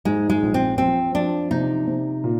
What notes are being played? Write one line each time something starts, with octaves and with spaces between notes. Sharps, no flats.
G#2 G#3
G#3
A#1
C4
F3 C4
F3 D4
C3 D#4
C3
A#2